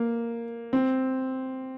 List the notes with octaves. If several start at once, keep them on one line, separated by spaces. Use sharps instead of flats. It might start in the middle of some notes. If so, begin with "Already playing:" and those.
Already playing: A#3
C4